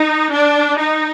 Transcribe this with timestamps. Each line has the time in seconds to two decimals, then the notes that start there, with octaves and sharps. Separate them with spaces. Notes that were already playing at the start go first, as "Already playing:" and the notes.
Already playing: D#4
0.32 D4
0.79 D#4